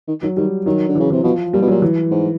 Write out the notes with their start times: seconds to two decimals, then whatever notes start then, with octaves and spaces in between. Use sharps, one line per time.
0.08 D#3
0.22 D#3 F#3
0.37 D#3 G3
0.66 D#3 F#3
0.89 D3
0.95 C#3 E3
1.10 C3 E3
1.23 B2 F3
1.53 A#2 G3
1.62 B2
1.68 A#2 F#3
1.82 E3
2.11 G#2